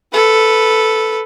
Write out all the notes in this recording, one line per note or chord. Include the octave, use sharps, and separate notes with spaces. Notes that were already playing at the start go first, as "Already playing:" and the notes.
A4 B4